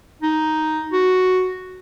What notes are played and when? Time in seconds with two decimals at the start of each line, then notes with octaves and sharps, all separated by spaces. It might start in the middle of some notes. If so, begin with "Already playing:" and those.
0.22 D#4
0.92 F#4